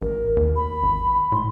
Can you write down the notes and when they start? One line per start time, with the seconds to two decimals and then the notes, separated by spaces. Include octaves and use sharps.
0.02 A1 A#4
0.37 D#2
0.56 B5
0.83 G#1
1.32 A2 C6